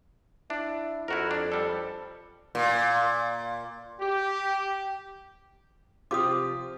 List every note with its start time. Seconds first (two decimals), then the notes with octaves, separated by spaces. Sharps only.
0.50 D4 E4
1.08 F2 E4 F#4 A#4
1.31 D4
1.52 G3 A4
2.55 A#2
4.00 G4
6.11 C3 F3 F4 G4 D6 D#6